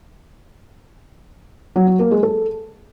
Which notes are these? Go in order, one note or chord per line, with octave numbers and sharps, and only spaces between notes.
F#3
F#3
A#3
G#3
A4